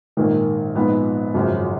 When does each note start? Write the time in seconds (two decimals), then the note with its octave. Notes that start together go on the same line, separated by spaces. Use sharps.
0.17 A#1 G#2 D#3 A#3
0.75 A#1 G#2 F3 B3 D#4
1.34 G#1 F#2 C#3 F3